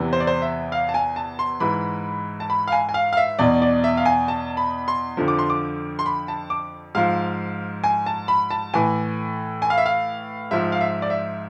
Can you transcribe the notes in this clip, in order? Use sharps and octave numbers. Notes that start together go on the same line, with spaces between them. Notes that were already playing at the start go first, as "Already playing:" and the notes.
Already playing: E2 C3 E3
C5
D5
C5
E5
F5
A5
G#5
A5
C6
G#2 E3 B5
A5
B5
F5
G#5
G#5
F5
F5
E5
E2 B2 D5
D5
E5
F5
G#5
A5
B5
C6
F2 D3 F3
D6
C6
D6
C6
B5
A5
D6
G#2 F3 F5
G#5
A5
B5
A5
A2 E3 G#5
G#5
F5
E5
F5
G#2 F3 E5
F5
E5
D5
E5